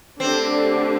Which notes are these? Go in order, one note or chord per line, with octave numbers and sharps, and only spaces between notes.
D3 A3 C4 D4 G4